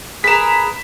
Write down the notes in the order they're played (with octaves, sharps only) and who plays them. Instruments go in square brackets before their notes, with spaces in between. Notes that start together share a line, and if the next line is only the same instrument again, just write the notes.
[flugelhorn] G#4 [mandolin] A#4 B4 [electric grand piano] B6 E7